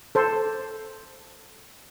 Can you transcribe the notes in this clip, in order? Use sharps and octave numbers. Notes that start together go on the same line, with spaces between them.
A4 C5